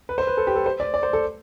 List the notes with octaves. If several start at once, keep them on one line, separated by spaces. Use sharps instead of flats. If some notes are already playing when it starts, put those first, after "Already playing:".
B4
C5
B4
A4
G4
A4
C5
D5
D5
C5
A4